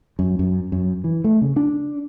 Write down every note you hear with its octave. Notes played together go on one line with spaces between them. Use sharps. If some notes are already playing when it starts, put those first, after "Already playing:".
F#2
F#2
F#2
E3
A3
C#3
D4